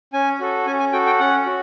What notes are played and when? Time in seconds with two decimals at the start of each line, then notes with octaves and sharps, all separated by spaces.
0.13 C#4 G#5
0.40 F#4 A4
0.67 C#4 G#5
0.80 G#5
0.93 F#4 A4 G5
1.07 G5
1.20 C#4 F#5
1.46 F#4